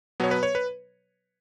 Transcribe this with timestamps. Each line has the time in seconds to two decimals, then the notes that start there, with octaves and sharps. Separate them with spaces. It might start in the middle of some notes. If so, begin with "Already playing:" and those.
0.20 B2 F#3 B3 C#5
0.31 B4
0.43 C#5
0.55 B4